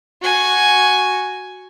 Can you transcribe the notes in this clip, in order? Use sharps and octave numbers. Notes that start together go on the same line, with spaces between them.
F#4 G#5